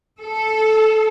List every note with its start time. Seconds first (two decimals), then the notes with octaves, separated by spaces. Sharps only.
0.20 A4